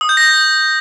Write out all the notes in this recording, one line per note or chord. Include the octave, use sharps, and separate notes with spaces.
D#6
G6
A#6